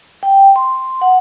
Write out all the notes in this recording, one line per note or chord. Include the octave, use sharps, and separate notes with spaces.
G5
C6
F#5